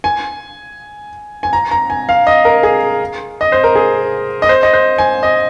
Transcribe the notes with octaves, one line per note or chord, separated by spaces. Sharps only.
G#5
G#5
A#5
A#5
G#5
F5
D#5
A#4
G#4
D#5
C5
A#4
G#4
D#5
C5
D#5
C5
G#5
D#5